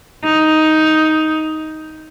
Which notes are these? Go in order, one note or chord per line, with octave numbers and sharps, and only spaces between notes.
D#4